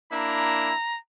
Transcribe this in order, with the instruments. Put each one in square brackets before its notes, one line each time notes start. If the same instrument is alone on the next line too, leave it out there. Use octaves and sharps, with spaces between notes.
[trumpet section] A#3 D4 E4 [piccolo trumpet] A#5